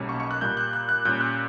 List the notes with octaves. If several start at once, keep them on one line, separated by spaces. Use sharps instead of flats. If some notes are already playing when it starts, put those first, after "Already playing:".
Already playing: B1 B2 G3 A#3 C#4
C#6
C#6
F#6
A#2 G3 A#3 G6
F#6
F#6
F#6
A#2 G3 C#4 G6
F#6